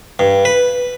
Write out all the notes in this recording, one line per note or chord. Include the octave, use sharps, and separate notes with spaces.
G2
B4